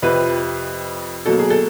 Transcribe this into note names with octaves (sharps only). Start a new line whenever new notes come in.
F2 C3 F3 B4
B2 F#3 A#3 A4
G#4
A4